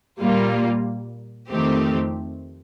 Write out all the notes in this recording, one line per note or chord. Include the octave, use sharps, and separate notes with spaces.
A#2 G3 A#3 F4
F2 D#3 A3 C4 G4